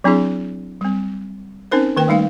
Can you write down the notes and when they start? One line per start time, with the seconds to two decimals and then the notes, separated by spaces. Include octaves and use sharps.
0.04 F#3 C4 D4 E4 G#4
0.81 G3 C4
1.72 C4 C#4 D#4 A#4 C5
1.96 D#3 A#3 A#4 G5
2.08 G3 A3 D#4 F5